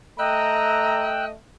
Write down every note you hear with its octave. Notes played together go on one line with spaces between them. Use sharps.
A3 D#5 G5 A#5 E6 F#6